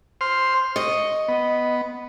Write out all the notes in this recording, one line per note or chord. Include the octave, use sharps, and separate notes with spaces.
C5 C6 F6
D#5 C#6
B3